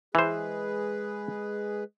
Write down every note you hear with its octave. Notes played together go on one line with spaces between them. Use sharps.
E3 G#3 G#4 B4 C5